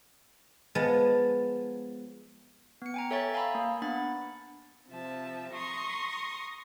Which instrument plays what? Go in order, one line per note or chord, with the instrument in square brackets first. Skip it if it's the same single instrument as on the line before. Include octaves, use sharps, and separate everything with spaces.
[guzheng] F3 G#3 B3 A5
[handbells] B3 C#7
G5 G#5 A#5
A4 C#5 E5 G#5 C#6 A6
F5 G#5 A#5 B5 E6
A#3
B3 D4 F#5 B5 A6
[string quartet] C3 F3 E5 A5
A#5 C6 C#6 D#6